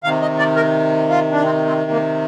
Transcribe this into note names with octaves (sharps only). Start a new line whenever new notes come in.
C3 D#3 F5
D#5
D5
A#4
F4
D4
C4
C4
A#3